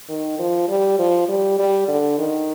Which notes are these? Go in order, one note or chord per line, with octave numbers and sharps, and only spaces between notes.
D#3
F3
G3
F3
G3
G3
D3
D#3